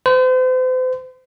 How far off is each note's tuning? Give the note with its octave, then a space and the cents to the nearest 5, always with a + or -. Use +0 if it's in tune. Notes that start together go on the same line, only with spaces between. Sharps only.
C5 -40